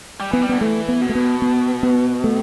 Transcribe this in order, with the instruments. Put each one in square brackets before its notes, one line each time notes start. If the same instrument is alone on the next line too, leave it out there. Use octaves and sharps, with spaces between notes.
[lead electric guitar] G3
[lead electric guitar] E3 [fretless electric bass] B3
[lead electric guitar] G3
[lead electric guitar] D3 [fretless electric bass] B3
[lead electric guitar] E3 [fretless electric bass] A3
[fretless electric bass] B3
[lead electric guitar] B2
[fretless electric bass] A3
B3
B3
B3
A3